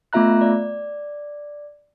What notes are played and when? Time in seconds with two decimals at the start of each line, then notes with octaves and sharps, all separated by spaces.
0.13 A3 B3 F4 E5 A#5 F#6
0.41 D5